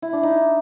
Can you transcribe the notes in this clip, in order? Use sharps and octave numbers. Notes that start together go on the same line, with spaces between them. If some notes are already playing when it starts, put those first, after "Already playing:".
E4
D4
D#4